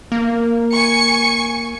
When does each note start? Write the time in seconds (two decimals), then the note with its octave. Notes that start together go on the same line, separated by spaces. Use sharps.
0.12 A#3
0.72 G#5 C#6 C#7